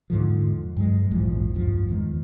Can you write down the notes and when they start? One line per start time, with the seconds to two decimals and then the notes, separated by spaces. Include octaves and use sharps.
0.10 E2 G#2 D3 F3
0.77 G2 F#3 G#3
1.11 A#1 E2 G#2 F3
1.54 G#1 D2 G2 F3
1.89 E2 D#3 G#3